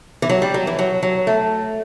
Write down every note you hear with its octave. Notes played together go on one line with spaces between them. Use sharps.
E3
F#3
G3
F#3
E3
F#3
F#3
A3